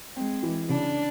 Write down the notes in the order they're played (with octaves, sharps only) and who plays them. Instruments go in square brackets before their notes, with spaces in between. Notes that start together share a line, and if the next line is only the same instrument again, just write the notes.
[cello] G#3 [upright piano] C4
[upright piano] E3
[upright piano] C#3 [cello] D4